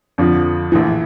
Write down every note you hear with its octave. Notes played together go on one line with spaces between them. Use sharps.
F2 D3 F3
A#1 A2 E3